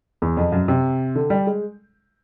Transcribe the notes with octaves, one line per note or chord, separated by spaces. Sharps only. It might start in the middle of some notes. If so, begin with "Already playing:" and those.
E2
F2
F#2
C3
D3
G3
G#3